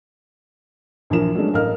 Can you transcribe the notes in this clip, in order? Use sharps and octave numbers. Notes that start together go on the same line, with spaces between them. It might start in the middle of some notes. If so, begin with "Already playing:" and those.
A#1 E3 F3 A#4 E7
F#3 G#3 A3 C#4 D4
A1 A#4 D#5 F5 F6